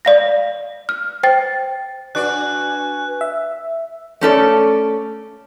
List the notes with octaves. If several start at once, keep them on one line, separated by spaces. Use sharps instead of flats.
D5 F5 A#6
F6
C5 G5 A6
D4 F#4 B4 D5 G#5 F#6
E5
A3 C#4 A4 D5